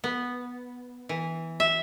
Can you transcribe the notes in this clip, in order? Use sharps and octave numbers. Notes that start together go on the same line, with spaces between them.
B3
E3
E5